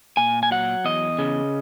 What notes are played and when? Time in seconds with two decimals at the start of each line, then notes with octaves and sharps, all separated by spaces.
0.17 A#2 G#5
0.43 G#5
0.51 F#3 F#5
0.85 E2 D#5
1.19 C#3